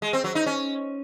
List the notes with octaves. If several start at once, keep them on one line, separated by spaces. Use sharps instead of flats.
G#3
C4
F#3
D#4
C#4